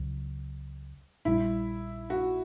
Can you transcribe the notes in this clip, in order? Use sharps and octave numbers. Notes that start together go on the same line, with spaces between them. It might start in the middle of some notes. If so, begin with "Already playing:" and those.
Already playing: C#2 C#3 F#3
A#1 A#2 G3 E4
F#4